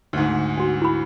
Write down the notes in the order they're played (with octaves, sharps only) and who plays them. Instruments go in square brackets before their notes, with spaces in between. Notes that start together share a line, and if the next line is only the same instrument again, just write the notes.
[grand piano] D2 G#2
[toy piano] D4 F#4
E4 B5